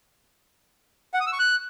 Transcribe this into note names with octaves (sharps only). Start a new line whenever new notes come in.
F#5
D#6
E6
C#6
F#6